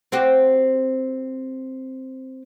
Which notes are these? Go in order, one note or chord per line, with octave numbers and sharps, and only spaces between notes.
C4 F#4 G4